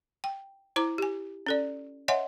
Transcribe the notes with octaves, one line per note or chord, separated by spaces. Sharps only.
G5
E4 C5 A#5 D6
G4 G#5
C#4 A4 D5
C#5 D#5 E5 F#5 G#5 C6